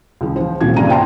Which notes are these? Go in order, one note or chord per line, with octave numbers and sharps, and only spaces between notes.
C#2 F3
F3 C5
D#1 C3 F3 F#4 G#6
A#1 G2 C#3 F3 A#5 D#7
C5 F#5 G5 A5 A#5 C6